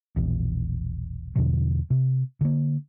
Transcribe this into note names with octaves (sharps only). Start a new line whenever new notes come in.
E1 A#1 E2
E2 B2 D3 F3
C3
D3 A#3